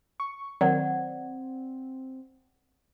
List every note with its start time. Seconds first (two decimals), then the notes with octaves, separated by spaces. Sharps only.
0.20 C#6
0.61 D#3 F#3 C4 D5 F#5